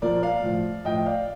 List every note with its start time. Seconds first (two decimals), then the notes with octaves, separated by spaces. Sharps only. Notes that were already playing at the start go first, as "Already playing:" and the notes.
0.02 A#2 F3 A#4 D5
0.22 D5 F5
0.43 A2 F3
0.85 A2 F3 D#5 G5
1.06 D5 F5